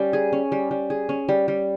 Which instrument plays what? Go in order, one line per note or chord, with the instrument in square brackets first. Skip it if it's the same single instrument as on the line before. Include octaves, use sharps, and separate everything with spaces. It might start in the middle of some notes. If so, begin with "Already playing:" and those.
Already playing: [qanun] G3 C#4
G#4
C#4
G3
G3
G#4
C#4
G3
G3